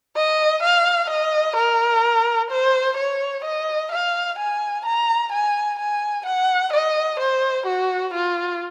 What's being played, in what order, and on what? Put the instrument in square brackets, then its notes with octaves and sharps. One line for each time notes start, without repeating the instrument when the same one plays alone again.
[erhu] D#5
F5
D#5
A#4
C5
C#5
D#5
F5
G#5
A#5
G#5
G#5
F#5
D#5
C5
F#4
F4